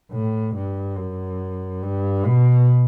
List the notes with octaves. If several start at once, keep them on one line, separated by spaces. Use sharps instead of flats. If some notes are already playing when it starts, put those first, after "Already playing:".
A2
G2
F#2
G2
B2